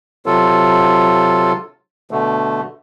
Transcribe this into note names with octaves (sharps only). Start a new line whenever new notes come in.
C3 F#3 F4 A4
B2 D3 A3